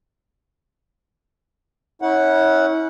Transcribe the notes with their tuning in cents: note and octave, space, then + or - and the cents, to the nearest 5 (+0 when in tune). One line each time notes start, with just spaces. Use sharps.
C#4 +0 E4 -35 F#5 +0